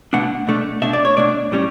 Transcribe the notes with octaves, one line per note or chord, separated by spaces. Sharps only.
B2 A3 D4 F#5
B2 A3 D4
B2 A3 D4 E5
D5
C#5
B2 A3 D4 D5
A2 G3 C#4